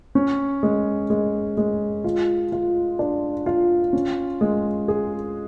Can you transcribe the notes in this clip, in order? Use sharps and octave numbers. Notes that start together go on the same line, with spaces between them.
C#4
G#3
G#3
G#3
F4
F4
D4
F4
C#4
G#3
G#4